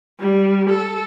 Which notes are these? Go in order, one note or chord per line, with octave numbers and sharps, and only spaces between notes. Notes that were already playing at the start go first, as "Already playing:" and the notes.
G3
A4